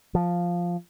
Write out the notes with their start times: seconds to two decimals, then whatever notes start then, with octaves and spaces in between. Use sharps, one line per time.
0.15 F3